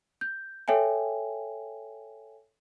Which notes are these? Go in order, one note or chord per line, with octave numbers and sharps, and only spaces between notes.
G6
A4 C#5 E5 G5 G#5